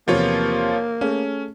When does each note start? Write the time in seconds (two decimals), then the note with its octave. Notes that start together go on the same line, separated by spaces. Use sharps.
0.08 E2 C3 F3 A#3 F4 B4 C#5
1.01 A3 C#4 G#4 C#5